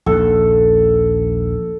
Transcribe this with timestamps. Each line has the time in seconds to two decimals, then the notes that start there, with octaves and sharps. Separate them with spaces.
0.06 A#1 D#2 A4